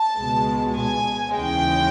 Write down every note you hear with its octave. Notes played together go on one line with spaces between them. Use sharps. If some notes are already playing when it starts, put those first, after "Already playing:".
Already playing: A5
C#2 B2 G#3
G#5
D#2 C#3 E3 G#3 G5